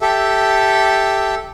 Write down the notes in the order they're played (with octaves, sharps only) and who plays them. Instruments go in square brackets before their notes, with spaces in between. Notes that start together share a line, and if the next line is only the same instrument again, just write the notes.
[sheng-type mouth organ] G4 A4 E5